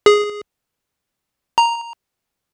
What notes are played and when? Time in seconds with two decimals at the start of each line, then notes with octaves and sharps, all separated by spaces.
0.06 G#4
1.58 A#5